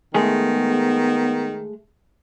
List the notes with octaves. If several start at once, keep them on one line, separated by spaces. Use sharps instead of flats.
D#3 G#3 A3 B3 G#4